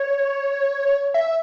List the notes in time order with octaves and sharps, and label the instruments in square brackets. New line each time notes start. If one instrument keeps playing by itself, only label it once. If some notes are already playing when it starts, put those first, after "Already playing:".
Already playing: [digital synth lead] C#5
E5